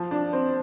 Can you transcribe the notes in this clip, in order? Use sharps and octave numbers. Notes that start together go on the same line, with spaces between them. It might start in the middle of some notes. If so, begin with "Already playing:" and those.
Already playing: F3
D4
C4